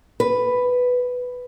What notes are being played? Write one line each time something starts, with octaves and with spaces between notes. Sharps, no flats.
B4